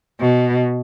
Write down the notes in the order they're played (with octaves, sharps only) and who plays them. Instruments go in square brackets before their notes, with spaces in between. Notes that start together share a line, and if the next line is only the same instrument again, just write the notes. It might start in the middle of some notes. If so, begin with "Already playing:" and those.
[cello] B2